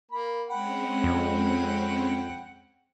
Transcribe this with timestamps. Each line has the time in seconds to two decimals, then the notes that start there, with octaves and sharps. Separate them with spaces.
0.11 A#3 B5
0.49 G#3 C4 C#4 F#5 G5 B5
1.04 F2